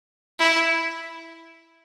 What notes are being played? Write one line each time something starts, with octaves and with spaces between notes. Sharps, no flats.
E4